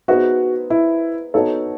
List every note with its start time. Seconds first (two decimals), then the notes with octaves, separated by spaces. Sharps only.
0.08 B3 D#4 F#4 G#4 C5 E5
0.70 E4
1.34 B3 D#4 F#4 A4 C#5